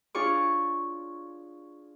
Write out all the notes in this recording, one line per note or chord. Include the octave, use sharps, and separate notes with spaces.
D4 F4 G#4 C#5 C#6 D6